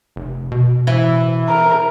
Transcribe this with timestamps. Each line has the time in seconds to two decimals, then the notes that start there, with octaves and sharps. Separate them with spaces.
0.16 F1
0.52 B2
0.87 E3
1.48 A#4